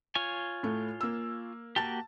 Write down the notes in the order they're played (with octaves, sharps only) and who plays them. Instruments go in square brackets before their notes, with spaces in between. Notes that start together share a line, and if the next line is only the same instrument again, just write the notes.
[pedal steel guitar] F4 C#5 G#5
[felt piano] A2 A3
A#3 E6
[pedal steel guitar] A#3 F#4 G4 [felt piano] A5 A6